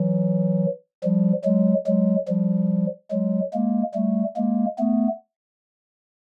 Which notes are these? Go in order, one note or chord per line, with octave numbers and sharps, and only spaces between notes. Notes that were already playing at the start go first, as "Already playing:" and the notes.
Already playing: E3 F#3
F3 G3
F#3 G#3
F#3 G#3
F3 G3
F#3 G#3
G#3 A#3
G3 A3
G#3 A#3
A3 B3